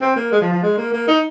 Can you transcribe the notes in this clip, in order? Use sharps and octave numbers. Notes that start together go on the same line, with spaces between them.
C4
A#3
G#3
F3
F3
G#3
A#3
A#3
D#4